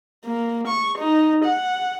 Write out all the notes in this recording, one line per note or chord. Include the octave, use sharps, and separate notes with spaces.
A#3
C#6
D#4
F#5